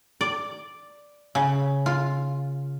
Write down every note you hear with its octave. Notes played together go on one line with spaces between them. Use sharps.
D5
C#3
F4